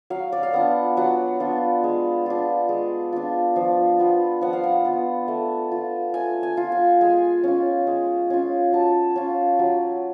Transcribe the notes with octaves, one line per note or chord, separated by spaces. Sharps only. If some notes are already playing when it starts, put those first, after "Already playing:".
F#3 F5
D5
F5
B3 D4 F4 F#5
F#3 F#5
B3 D4 F4
G#3
D4 F4
G#3
D4 F4
F3
B3 F4
F3 F#5
F5
F#5
B3 F4
A3
F4
A3 G#5
G#5
F4
G#5
G#3 G#5
C#4 F4
G#3
C#4 F4
F#3 A5
C#4 F4
F#3